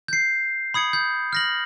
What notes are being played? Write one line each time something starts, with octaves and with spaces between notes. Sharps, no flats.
G6 C7
B5 D#6 G#6 C#7
G6
F6 A#6 F#7